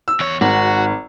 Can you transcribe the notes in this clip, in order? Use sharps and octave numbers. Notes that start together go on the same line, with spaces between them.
E6
E2 C#5
G#1 F#4